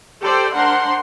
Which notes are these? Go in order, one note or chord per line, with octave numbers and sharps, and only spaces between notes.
G4 A4 C5 D5 G5
D4 A#4 C5 F#5 C6